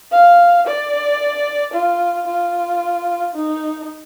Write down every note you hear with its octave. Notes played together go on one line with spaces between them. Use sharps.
F5
D5
F4
F4
D#4